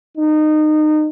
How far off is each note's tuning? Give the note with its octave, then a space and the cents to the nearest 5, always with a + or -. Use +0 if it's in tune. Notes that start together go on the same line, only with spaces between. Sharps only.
D#4 -25